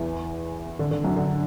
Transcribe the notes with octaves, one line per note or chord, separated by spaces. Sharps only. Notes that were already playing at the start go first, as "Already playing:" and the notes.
Already playing: E2 E3
D3
D3
F#2 F#3
D3